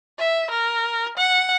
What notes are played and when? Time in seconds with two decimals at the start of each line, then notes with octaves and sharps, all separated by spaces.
0.19 E5
0.51 A#4
1.18 F#5